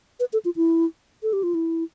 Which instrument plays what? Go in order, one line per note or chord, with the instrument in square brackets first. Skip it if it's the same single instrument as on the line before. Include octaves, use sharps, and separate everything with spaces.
[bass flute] B4
A4
F4
E4
A4
G4
F4
E4